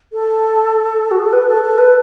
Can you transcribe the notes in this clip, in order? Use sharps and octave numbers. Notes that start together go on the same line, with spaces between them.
A4
F#4
G#4
A4
B4
A4
A4
B4